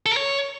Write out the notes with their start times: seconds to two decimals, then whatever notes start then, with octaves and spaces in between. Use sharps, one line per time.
0.06 A4
0.11 A#4
0.17 C#5